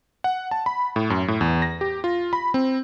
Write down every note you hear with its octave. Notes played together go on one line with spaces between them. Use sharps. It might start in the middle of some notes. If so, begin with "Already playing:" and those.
F#5
A5
B5
A2
F#2
A2
E2
A#6
G4
F4
B5
C4